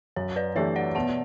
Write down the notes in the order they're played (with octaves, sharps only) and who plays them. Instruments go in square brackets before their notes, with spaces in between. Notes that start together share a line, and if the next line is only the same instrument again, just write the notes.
[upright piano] F#2 [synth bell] C#5
[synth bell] B4 D5
[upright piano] E3 A3 D4 G4 [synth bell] C#5 E5
[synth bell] D5 F#5
[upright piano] B2 [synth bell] F#5 A5